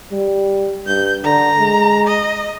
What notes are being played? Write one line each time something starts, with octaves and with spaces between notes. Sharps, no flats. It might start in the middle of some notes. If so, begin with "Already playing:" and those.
G3
G2 G6
D3 A#5
G#3
D#5